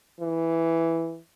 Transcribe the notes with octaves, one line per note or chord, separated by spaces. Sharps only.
E3